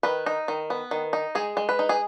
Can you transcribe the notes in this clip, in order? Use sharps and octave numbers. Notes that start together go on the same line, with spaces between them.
D#3 B4
D#4
D#3
B3
D#3
D#4
G#3 G#4
G#3
B4
D#4
G#4